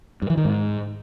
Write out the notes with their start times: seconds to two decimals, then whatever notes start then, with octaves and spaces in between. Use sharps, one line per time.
0.22 G2
0.30 E3
0.37 D#3
0.45 G#2